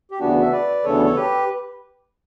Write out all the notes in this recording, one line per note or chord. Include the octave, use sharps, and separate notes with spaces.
G4
D2 C#3 E3 B3 D4 F#4
E5
B4 D5
D2 C#3 E3 B3 D4 A4 C#5
C#5
G4 B4